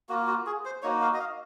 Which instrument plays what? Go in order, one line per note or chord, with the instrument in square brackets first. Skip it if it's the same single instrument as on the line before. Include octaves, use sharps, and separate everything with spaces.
[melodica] A#3 F4 F#4
F#4
G#4
C5
A#3 D#4 F#4 C#5
F5
D#5
F5